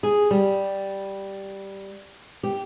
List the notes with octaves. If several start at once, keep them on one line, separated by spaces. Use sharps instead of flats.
G#4
G3
G4